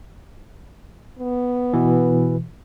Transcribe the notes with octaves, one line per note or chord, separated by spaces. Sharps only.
B3
B2 E3